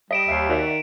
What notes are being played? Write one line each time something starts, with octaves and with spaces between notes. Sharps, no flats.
G3 D#5 B6 D7 E7
D#2 E5 G5 C7
D#3 F#4 D5 E5